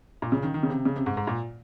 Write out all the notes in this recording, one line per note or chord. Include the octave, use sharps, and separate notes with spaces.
A#2
C#3
D#3
D#3
C#3
C3
C#3
C3
G#2
G#2
A#2